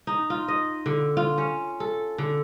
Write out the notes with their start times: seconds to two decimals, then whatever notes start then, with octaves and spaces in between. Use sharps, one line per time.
0.07 D#4
0.30 F4
0.48 D#5
0.86 D3
1.17 F4
1.38 C#4
1.80 A4
2.18 D3